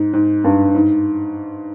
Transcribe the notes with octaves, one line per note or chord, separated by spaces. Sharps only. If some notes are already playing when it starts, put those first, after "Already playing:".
Already playing: G#2
G#2
G2
G#2